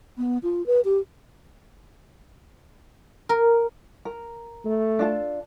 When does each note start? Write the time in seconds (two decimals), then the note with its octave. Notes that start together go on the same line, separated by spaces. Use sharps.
0.18 B3
0.43 F4
0.66 B4
0.85 G4
3.29 A#4
4.05 A#4
4.65 A3
4.99 D4 F4 A4